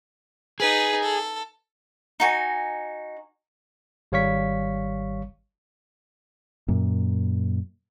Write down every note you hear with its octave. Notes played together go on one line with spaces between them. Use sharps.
D#4 G#4 B4
A4
D#4 F#4 G#5
G#1 G3 C#5 F5 C#6 B6
F#2 A#2